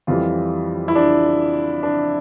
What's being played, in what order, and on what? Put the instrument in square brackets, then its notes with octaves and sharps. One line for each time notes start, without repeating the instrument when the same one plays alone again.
[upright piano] F2 E3 G3 F4
E4
D4
D4